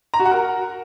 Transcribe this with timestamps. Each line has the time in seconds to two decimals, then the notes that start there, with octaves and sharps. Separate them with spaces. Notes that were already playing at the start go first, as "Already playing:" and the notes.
0.14 A#5
0.19 F#4
0.25 F#5
0.31 A#4